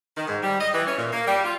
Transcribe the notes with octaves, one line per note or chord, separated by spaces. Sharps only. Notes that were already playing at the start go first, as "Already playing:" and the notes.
D#3
G#2
G3
D#5
E3
C#4
A#2
A#3
G3
F4